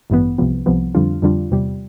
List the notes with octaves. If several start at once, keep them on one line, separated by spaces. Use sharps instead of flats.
A1 G2 E3 B3
C2 C3 F3 B3
C2 C3 F3 B3
F2 D3 G3 D4 F4
F2 D3 G3 D4 F4
E2 C3 G3